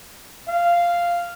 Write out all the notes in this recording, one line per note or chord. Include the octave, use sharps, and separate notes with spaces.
F5